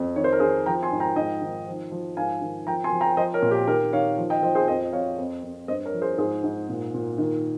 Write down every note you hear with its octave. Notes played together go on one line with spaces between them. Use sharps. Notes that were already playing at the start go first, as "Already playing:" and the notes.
Already playing: F2
D#3 C#5
C5
A#4
D#3 G#4 C5
F3 G5 A#5
G#5 C6
G#2
G5 A#5
G#2 D#5 G5
D#3
F3
F3
G#2 F5 G#5
D#3
F3 G5 A#5
G#5 C6
F3
G5 A#5
F3 C5 D#5
A#4 C#5
A#2
G4 A#4
D#3 G4 A#4
D#3 C#5 F5
F3
D#5 G5
F3 C5 D#5
G#4 C5
F2 C5 D#5
F2 C#5 F5
F2
F2
G2 C5 D#5
A#4 C#5
F3
G#4 C5
G#2 G#4 C5
G#2
A#2
A#2
D#3